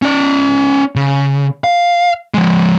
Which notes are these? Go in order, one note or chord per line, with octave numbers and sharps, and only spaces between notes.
C#4 D5
C#3
F5
F3 G#3